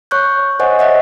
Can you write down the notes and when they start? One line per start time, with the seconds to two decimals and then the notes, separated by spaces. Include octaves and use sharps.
0.11 C#5 C#6 F#6 G6
0.60 C5 C#5 D#5 F#5 G#5 C#6
0.79 C#5 D#5 E5 F#5